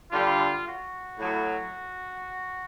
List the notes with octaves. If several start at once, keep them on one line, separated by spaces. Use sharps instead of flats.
D3 G3 F4
F#4
A2 F#3